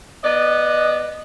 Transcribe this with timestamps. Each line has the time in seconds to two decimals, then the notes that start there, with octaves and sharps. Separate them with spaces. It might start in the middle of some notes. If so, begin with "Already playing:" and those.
0.24 B3 D5 D#5